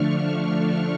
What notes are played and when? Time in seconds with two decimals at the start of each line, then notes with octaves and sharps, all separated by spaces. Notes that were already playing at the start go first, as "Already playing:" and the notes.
Already playing: D3 F3 A3 D4 C#6 F6